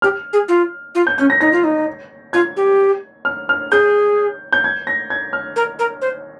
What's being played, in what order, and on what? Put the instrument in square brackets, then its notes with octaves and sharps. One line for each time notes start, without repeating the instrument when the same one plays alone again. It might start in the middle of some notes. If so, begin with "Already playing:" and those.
[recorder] G4 [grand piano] F6
[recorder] G#4
F4
F4
[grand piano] G6
[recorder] C#4 [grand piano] G6
[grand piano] A#6
[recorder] D#4 [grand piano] A#6
[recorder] F4
D#4
[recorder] F4 [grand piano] G#6
[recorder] G4
[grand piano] F6
F6
[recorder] G#4 [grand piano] G6
[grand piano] G6
G#6
A#6
G#6
F6
[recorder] A#4
A#4
C5